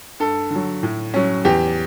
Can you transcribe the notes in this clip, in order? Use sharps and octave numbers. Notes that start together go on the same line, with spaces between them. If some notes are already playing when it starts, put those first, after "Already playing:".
G2 A4
D3 F#3
A2
F#3 C#4
E2 G4